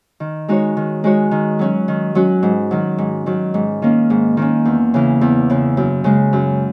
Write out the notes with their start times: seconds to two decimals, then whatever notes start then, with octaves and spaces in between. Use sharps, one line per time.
0.20 D#3
0.48 G#3 D#4 F#4 C#5
0.77 D#3
1.04 G#3 D#4 F#4 C#5
1.31 D#3
1.59 F#3 C#4 F#4
1.88 D#3
2.15 F#3 C#4 F#4
2.43 G#2
2.71 D#3 F#3
2.98 G#2
3.26 D#3 F#3
3.54 G#2
3.82 D#3 A#3 C#4
4.10 G#2
4.37 D#3 A#3 C#4
4.65 E2
4.94 C#3 E3
5.21 E2
5.50 C#3 E3
5.77 F#2
6.04 C#3 G#3
6.33 F#2